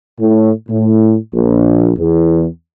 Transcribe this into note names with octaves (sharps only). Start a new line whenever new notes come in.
A2
A2
A#1
E2